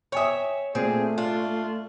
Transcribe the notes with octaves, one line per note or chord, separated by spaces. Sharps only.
C#5 E5 G5 G#5 D#6
A#2 A3 C4 G#4
D4 F4